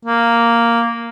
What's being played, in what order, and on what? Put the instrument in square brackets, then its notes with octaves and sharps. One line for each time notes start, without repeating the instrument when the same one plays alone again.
[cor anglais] A#3